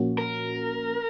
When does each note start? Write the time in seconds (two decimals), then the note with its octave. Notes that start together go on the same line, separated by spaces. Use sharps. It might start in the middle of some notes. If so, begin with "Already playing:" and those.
Already playing: A#2 F3 A#3 C#4 F#4
0.18 A#4